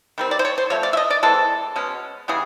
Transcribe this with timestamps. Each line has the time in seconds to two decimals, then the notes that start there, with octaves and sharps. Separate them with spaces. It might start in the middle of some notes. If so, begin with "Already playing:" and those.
0.18 D#3 G3 C4
0.31 D5
0.39 C5
0.45 C#5
0.58 C5
0.70 F3 A3 C4 C#5
0.83 D5
0.93 E5
0.97 D#5
1.10 D5
1.23 E3 G#3 C4 A4
1.76 B2 G#3 C#4
2.28 C#3 E3 G3 B3 G#4